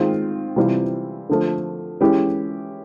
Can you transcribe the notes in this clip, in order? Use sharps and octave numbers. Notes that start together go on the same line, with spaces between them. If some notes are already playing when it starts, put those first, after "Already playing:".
Already playing: D#3 G#3 C4 F4
C3 E3 G3 C4 F4
D3 F3 A3
E3 G#3 C#4 E4 G4